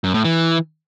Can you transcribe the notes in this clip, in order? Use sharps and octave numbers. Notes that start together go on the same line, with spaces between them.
F#2
A2
E3